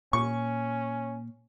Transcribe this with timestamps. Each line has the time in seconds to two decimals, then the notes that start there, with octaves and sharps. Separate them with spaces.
0.13 A#2 C#4 C#6